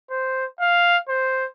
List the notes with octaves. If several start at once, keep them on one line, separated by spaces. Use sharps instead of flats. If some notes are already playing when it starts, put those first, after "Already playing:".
C5
F5
C5